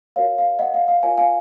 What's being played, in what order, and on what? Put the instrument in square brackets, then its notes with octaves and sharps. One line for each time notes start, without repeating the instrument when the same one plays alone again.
[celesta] F#4 A#4 C#5 F5
F5
D#5 F#5
F5
F5
F4 A#4 C#5 F5 G#5
F5 G#5